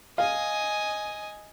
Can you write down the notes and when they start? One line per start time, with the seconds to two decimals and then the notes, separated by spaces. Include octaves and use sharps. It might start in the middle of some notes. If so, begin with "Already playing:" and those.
0.18 D#5 F5 G#5